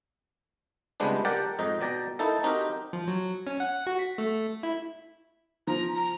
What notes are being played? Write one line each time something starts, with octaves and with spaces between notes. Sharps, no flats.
C#2 C3 G3 G#3 B3 D4
G4 A#4 D5 F#5 G5 A5
F2 G#2 D#4 D#5
B2 D5 G5 A#5
A#3 D#4 E4 A4
C4 D#4 F#4 G4 A#4
F3
F#3
C#4
F#5
F#4
B6
A3
E4
F3 A#5
A#5